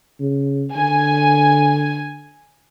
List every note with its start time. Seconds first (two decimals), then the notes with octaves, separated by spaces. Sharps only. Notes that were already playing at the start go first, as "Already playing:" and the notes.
0.20 C#3
0.76 D3 G#5